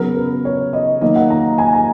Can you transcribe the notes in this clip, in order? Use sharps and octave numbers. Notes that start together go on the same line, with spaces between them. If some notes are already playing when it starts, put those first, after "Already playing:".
Already playing: C#3 F#3 B3 A#4
B4
C#5
D#5
D#3 F#3 A#3 D#5
F#5
A#5
G#5
A#5